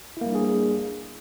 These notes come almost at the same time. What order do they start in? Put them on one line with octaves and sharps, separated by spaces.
E4 A#3 G3 D4 G#4